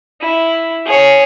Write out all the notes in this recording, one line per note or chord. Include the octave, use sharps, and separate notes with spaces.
E4
G#4 C#5